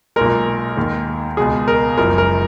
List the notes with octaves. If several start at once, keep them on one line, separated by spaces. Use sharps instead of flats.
B1 A#2 G#3 A#4
D#2 D#3 G#3
C#2 B2 G#3 G#4
A#4
F#1 F#2 F3 G#3 A#4
A#4